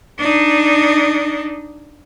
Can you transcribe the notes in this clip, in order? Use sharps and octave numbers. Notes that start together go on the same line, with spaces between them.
D4 D#4